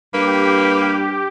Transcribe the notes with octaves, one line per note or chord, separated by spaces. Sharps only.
G2 A#3 G4 B4